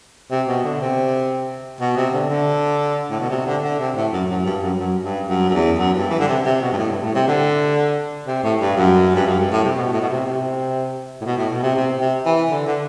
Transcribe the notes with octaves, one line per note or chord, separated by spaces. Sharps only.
C3
B2
D3
C3
B2
C3
D3
D3
A2
B2
C3
D3
D3
C3
A2
F#2
F#2
G2
F#2
F#2
G2
F#2
F#2
E2
F#2
G2
E3
D3
C3
C3
B2
G2
A2
G2
A2
C3
D3
C3
A2
G2
F#2
G2
F#2
G2
A2
C3
B2
A2
B2
C3
C3
A2
B2
A2
B2
C3
C3
C3
E3
D3
D3